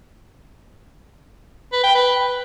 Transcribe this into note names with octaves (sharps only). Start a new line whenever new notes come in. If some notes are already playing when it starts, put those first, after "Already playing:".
B4
G5
B4